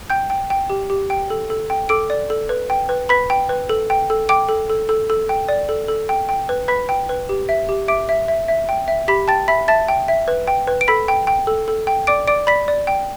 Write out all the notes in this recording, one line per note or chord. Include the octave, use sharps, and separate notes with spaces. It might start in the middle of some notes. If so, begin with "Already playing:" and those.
G5 G6
G5
G5
G4
G4
G5
A4
A4
G5
A4 D6 D7
D5
A4
B4
G5
B4
B4 B5 B6
G5
B4
A4
G5
A4
G5 D6 D7
A4
A4
A4
A4
G5
D5
A4
A4
G5
G5
B4
B4 B5 B6
G5
B4
G4
E5
G4
E5 D6 D7
E5
E5
E5
G5
E5
G4 B5 B6
G5 A5 A6
E5 B5 B6
E5 A5 A6
G5
E5
B4
G5
B4
D7
A4 B5 B6
G5
G5
A4
A4
G5
D5 D6 D7
D5 D6 D7
D5 B5 B6
D5
G5